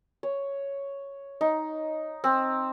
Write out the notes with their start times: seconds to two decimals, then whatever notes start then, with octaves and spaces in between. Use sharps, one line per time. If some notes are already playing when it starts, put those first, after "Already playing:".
0.23 C#5
1.41 D#4
2.24 C4